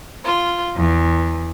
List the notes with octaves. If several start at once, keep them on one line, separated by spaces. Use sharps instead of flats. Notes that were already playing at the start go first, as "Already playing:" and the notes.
F4
E2